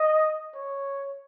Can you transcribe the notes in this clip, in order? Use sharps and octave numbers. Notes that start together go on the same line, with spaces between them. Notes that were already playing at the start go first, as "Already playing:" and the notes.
Already playing: D#5
C#5